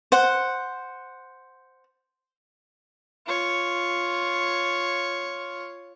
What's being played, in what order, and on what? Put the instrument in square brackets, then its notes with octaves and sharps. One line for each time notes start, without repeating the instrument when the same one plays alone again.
[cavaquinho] C5 F#5
[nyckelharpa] F4 C#5